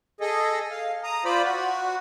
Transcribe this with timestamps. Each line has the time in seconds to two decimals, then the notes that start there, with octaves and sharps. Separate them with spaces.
0.20 G#4 A4 D#5
0.71 F5
1.03 A#5 D#6
1.25 F4 C5 D5 B5
1.43 F#4